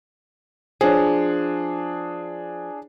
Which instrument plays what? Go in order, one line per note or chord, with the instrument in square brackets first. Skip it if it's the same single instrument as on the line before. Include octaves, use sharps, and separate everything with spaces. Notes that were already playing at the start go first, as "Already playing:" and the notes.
[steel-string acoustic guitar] F3 [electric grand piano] D4 G#4